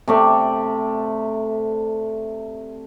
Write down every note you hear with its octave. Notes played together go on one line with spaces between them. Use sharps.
C3 A3 D5